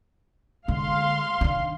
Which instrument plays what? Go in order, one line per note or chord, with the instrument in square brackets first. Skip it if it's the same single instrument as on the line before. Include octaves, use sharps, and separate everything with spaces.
[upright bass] D3 G#3 [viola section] F5 C6
[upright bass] D#3 D4